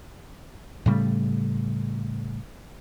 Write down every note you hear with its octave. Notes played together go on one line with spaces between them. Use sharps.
A2 C#3 G3 A3